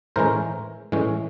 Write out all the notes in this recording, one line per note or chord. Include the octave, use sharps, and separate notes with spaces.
A2 E3 G#3 C#4 A#4 C5
A2 E3 G#3 C#4